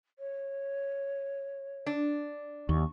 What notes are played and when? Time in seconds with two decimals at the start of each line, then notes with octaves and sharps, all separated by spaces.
0.19 C#5
1.86 D4
2.69 D#2 C#6